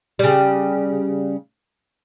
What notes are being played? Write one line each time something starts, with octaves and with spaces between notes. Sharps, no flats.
C#3 G3